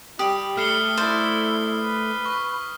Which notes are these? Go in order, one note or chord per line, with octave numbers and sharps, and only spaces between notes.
G3 G4 D#6
A3 F6 C7 G7
E4 C5 D5
B4
C#6